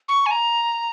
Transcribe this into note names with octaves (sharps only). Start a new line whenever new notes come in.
C#6
G#5
A#5